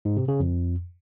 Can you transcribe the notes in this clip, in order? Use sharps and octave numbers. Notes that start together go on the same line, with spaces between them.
G#2
C3
C#3
F2